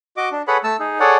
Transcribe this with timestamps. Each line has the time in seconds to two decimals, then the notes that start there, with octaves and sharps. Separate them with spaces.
0.17 F#4 D#5 D6
0.32 D4
0.48 G#4 A4 B4 C#5 F#5 B5
0.64 A3 A5 E6
0.80 D#4 G#4
1.00 G#4 A4 C#5 D5 F#5